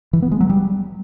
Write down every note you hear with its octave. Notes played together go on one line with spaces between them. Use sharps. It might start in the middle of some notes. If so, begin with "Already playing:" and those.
E3
B3
G#3
F#3
G3